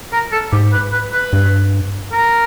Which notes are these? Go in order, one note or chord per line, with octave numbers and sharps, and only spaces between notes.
A#4
A4
G#2 G4
B4
B4
B4
G2
A#4